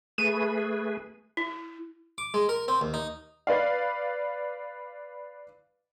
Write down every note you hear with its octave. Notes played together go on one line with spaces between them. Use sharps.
A3 G#4 B4 D#7
E4
D6
G#3
A#4
C4
D#2
D#4
B4 D5 F5